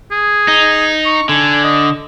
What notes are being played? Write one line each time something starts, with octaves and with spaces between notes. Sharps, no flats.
G#4
D#4
C#6
D3 G#5
D#5